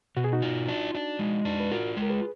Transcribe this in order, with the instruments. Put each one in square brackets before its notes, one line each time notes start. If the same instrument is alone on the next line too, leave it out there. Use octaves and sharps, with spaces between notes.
[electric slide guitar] B2 [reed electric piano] F#4
[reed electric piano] G#4
D#4 F#4
[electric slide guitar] F4
D4
D4
G#3
D4
[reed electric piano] B4
[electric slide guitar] F4 [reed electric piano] F#4 A#4
[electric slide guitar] G#3
[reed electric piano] A#4
G#4 B4